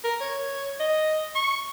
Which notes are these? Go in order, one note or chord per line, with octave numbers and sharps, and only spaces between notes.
A#4
C#5
D#5
C#6